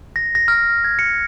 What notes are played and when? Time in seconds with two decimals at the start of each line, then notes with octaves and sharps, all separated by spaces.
0.16 A#6
0.35 A#6
0.48 F6
0.84 G#6
0.99 C#7